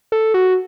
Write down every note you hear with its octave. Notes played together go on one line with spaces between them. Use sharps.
A4
F#4